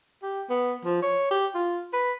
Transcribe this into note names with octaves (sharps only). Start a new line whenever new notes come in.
G4
B3
F3
C#5
G4
F4
B4